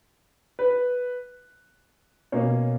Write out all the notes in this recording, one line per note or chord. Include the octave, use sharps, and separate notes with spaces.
B4
B2 A#3 C#4 C#5